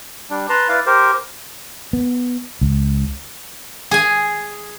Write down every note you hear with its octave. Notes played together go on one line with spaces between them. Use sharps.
G3 D4
B4 A5 A#5 C6
E4 B4 D5 F5
G4 A#4 C5
B3
C#2
G#4 G#5